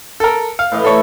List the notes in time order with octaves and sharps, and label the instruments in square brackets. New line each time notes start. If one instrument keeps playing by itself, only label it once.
[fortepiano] A4 A#4
F5
[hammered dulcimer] A2 E3 D#5
[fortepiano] A4 C#5